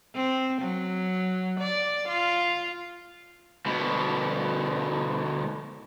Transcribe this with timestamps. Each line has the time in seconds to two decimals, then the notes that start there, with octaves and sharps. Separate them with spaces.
0.15 C4
0.61 F#3
1.60 D5
2.08 F4
3.66 D2 B2